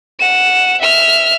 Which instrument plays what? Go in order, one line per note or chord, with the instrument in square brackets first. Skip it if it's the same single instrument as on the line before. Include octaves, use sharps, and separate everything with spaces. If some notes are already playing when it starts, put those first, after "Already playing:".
[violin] F#5 E7
E5 F6